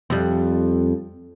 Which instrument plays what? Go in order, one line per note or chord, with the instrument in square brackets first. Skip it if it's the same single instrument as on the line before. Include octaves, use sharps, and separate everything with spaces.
[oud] F2 G3